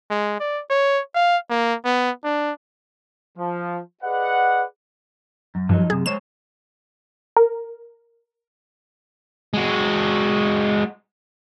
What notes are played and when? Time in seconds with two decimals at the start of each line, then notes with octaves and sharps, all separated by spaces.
0.10 G#3
0.40 D5
0.70 C#5
1.15 F5
1.50 A#3
1.85 B3
2.24 D4
3.38 F3
4.03 G#4 B4 D5 D#5 F#5
5.55 F#2
5.69 G2 F3 F#3 D#4
5.90 F#2 C3 G#4
6.06 G#3 C5 C#5 E7
7.37 A#4
9.54 G#3 F#4